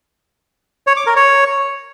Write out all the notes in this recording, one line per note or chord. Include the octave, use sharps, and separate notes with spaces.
C#5
D6
A#4
C#5